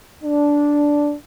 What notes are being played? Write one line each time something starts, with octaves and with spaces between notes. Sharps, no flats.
D4